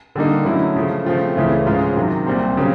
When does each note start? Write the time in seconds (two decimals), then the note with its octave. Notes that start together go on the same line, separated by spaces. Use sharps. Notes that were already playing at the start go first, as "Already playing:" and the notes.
0.15 D3 G3 A#3 D#4
0.45 D3 F#3 A3 C#4 E4
0.76 C#3 F3 A3
1.06 C#3 F3 A3 C4 F4
1.36 C#2 C#3 E3 A3 C#4
1.66 G#2 F3 G#3 C#4 F4
1.96 C3 D#3 F#3
2.26 C2 A#2 G3 C4
2.57 C#3 F#3 A#3 C#4